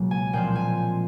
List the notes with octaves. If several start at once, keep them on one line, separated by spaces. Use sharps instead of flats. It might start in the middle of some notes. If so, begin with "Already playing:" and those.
Already playing: C#2 B2 F#3 A#3
G#5
A#2 F3 G#3 C4 G5
G#5